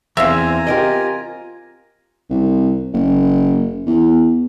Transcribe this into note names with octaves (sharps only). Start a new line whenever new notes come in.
E2 C4 C5 E5 F5 G#5 A#5
F4 G4 A#4 D#5
C2
F#1
E2